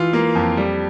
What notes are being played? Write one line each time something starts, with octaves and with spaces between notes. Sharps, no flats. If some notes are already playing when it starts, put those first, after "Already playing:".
Already playing: E3 F4
A#3
F2
G3